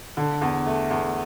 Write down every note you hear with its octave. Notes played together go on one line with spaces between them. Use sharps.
D3
E2
A3
E2